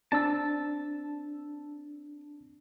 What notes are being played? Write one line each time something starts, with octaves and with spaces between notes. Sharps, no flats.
C4 D4 A5 E6